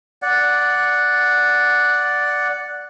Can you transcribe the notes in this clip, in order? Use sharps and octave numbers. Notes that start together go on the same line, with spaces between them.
D5 F#5